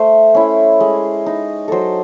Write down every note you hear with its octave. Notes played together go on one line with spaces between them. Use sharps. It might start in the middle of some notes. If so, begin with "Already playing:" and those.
Already playing: A3 C5
C#4 E4
G#3
D#4
F#3 A4 C5